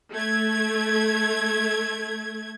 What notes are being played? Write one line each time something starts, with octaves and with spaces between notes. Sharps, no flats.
A3 G#6